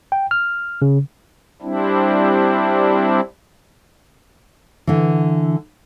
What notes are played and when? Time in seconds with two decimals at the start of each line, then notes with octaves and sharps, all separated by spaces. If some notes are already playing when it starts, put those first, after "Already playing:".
0.12 G5
0.31 F6
0.82 C#3
1.62 G3 C4 D4 E4
4.87 D3 E3